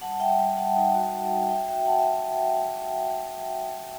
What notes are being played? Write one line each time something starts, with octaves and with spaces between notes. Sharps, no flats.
G3 F#5 A5
G3 E5 G5
G3 E5 G5
G3 F#5 A5
D#4
F#4
F#4
D#4
F#4 E5 G5
F#4 E5 G5
F#4 F#5 A5
E5